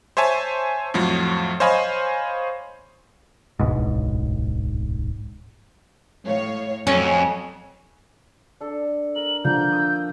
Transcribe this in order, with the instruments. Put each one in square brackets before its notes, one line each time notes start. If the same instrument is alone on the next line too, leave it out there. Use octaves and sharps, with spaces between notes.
[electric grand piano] C5 C#5 E5 G#5 A5
F2 A2 F3 F#3
C5 C#5 D#5 F5 G#5 B5
[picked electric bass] D1 B1 G#2
[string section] A2 C#5 F5
[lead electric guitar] F2 [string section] F#3 [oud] C#4 [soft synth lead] G#5
[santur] D4 A4
[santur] A#4 [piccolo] F#7
[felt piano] D3 F3 [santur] A#3 [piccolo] G6
[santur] D#6 E6